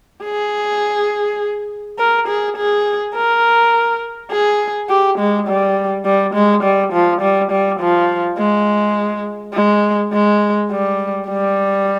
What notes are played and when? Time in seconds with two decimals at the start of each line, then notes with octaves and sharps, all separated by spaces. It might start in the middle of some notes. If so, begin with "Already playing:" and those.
0.24 G#4
1.99 A#4
2.28 G#4
2.57 G#4
3.15 A#4
4.31 G#4
4.90 G4
5.19 G#3
5.47 G3
6.05 G3
6.34 G#3
6.63 G3
6.93 F3
7.21 G3
7.51 G3
7.80 F3
8.38 G#3
9.54 G#3
10.13 G#3
10.71 G3
11.28 G3